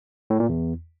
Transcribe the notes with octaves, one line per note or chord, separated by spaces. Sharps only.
A2
A#2
E2